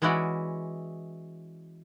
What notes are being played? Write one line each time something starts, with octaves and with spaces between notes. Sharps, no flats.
E3 G#3 C#4 E4 F#4 D5